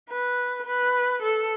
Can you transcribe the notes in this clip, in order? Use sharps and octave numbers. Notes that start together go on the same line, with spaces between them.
B4
B4
A4